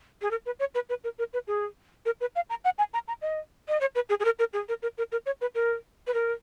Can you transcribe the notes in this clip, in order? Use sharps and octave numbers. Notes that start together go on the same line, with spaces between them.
G#4
A#4
B4
C#5
B4
B4
A#4
A#4
B4
G#4
A#4
B4
F5
A#5
F#5
G#5
A#5
A#5
D#5
D#5
C#5
B4
G#4
G#4
A#4
A#4
G#4
A#4
A#4
A#4
A#4
C#5
B4
A#4
B4
A#4